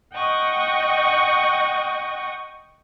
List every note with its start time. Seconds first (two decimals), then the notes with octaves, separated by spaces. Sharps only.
0.13 D#5 F#5 G5 C#6 D#6